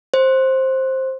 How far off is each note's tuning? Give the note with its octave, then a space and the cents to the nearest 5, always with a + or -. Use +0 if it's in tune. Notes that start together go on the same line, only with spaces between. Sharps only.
C5 +10